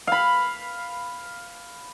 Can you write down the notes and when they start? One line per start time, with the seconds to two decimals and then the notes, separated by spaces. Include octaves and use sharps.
0.07 F5 B5